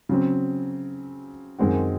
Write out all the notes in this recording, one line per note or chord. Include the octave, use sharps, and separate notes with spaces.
C#3 F#3 C4
F#2 D#3 G#3 C4 F#4